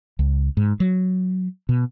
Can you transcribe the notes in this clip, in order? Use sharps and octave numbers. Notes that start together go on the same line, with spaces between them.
C#2
G#2
F#3
B2